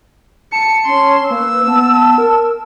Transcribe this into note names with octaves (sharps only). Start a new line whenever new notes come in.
A5 C#7
C#4 C6
A#3 B4 E6
B3 A5
A#4